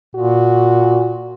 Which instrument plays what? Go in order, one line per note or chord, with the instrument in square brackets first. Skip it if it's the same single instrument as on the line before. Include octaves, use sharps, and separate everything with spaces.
[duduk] A#2 [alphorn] F#4